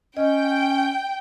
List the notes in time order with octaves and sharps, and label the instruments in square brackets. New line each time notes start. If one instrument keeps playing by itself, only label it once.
[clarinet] C#4 [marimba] D#5 [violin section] G5